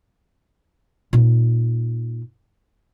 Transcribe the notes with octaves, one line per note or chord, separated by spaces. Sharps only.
A#2 D#4